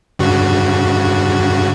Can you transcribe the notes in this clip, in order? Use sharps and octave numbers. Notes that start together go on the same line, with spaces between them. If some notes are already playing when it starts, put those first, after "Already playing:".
G2 C#3 F#4